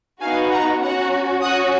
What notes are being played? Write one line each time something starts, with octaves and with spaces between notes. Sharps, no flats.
B3 D#4 F#4 F5 G#5
F#5 A#5
C#4 F#4 F#5 A#5
C#4 F#4 D#6 F#6